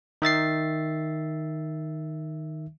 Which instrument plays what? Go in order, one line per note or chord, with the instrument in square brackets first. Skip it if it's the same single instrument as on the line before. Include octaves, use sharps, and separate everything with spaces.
[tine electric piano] D#3 E5 A6 C7